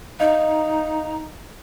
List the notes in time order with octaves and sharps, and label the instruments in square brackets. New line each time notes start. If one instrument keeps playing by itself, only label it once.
[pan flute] D#4 [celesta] D#5 F5